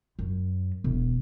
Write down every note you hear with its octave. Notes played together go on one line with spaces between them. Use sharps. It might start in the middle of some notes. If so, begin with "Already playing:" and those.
F#2
E1